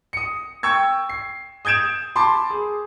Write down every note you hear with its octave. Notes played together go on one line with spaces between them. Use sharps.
D#6 C#7
G5 C#6 E6 G#6
C7
D#6 G6 G#6 D7 E7
A5 B5 C6 D6
G#4